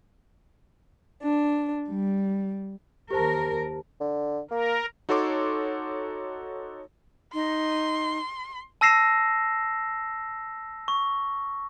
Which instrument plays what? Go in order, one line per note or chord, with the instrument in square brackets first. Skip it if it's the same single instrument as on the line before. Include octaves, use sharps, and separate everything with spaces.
[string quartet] D4
G3
[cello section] D#2 A#4 [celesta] G4 C5 A5
[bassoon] D3
[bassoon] A#3 [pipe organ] A#4
[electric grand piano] D#4 F#4 A4 C#5 C6 D6
[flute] D#4 [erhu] C6
[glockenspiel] A5 E6 A#6 C7 E7
C#6